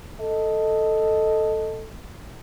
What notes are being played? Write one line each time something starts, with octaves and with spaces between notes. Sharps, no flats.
A4 D#5